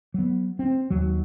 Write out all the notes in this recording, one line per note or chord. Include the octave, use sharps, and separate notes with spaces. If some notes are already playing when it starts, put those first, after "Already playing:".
F#3 B3
C4
D#2 F#3